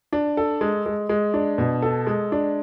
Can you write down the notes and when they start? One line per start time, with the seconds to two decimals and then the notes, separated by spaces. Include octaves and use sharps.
0.13 D4
0.37 A4
0.61 G#3
0.86 G#3
1.09 G#3
1.34 D4
1.58 B2
1.82 A4
2.07 G#3
2.32 D4